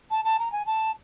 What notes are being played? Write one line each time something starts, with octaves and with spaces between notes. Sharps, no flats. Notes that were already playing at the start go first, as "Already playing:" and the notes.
A5
A5
A#5
G#5
A5